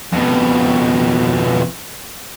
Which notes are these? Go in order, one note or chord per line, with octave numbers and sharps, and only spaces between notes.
F2 B2